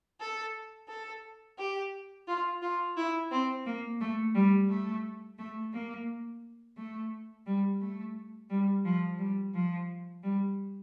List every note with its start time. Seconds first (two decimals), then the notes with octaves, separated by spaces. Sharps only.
0.20 A4
0.88 A4
1.58 G4
2.27 F4
2.61 F4
2.96 E4
3.30 C4
3.66 A#3
4.00 A3
4.34 G3
4.69 A3
5.38 A3
5.73 A#3
6.77 A3
7.46 G3
7.80 A3
8.49 G3
8.84 F3
9.18 G3
9.53 F3
10.23 G3